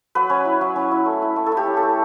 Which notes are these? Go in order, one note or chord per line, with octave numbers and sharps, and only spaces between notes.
F#3 B4
C#4
E4
F#3
C#4
E4
A3
E4
A3
A4
E4
G4
C#4
A4
A3